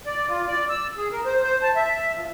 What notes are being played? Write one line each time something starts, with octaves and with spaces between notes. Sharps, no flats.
D5
F4
D5
E6
G#4
A#4
C5
C5
A5
E5
F3